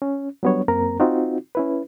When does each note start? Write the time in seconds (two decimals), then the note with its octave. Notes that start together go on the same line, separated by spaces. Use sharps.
0.02 C#4
0.43 F#3 G3 B3 D4 C#5
0.68 F#2 A#3 C4 A#4 A#5
1.00 C4 D#4 F4 F#4
1.55 C#4 E4 B4